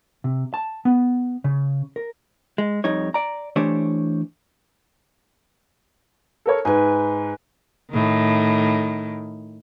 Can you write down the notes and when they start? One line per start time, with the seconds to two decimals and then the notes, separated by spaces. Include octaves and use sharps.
0.24 C3
0.54 A5
0.85 B3
1.44 C#3
1.96 A#4
2.58 G#3
2.84 F2 G3 D#4 C#5
3.14 D5 A#5
3.56 E3 A3 D4 G4 C5 C#5
6.46 A4 A#4 C#5
6.65 G#2 B4 G#5
7.91 A2 D#3